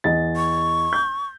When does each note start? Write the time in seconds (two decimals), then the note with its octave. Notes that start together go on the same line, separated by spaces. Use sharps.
0.04 E2 D#5 A6
0.36 C#6
0.93 G6